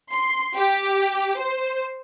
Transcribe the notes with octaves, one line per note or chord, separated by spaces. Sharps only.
C6
G4
C5